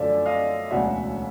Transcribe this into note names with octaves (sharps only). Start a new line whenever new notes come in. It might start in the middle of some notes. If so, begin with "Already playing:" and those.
Already playing: F#2 D3 F3 A3 D5 E5
D#5 F5
E1 D2 C#3 F#3 E5 F#5